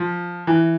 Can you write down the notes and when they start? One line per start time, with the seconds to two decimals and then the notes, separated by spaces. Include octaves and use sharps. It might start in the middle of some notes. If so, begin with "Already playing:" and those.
Already playing: F3
0.47 E3